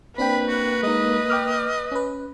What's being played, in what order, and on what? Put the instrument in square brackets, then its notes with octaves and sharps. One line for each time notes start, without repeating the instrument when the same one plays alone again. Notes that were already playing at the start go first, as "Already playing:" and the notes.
[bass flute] A#3 [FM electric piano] C4 D4 G5 [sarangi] B4 [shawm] B5
[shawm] F#4
[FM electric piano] G#3 D#4 [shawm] D#5
[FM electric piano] G5 D6 F6
C#4 B4